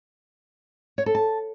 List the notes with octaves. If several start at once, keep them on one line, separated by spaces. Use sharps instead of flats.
C#5
A4
A5